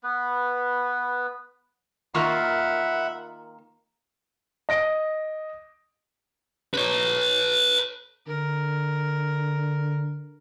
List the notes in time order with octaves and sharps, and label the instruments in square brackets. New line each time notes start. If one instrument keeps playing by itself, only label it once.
[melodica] B3 B4
[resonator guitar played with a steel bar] D#3 A#3 F4 [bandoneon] E5 F#5 B5
[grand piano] D#5 A#6 D7
[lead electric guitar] B4 C#5
[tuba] D3 [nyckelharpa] A#4